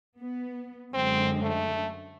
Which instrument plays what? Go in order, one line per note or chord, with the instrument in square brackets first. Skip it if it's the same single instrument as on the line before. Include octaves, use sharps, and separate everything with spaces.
[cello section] B3
[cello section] F#2 D3 G#3 [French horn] C4
[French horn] A3